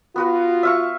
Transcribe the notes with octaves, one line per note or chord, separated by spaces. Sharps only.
B3 F4 F#4 B4
E5 F5 C#6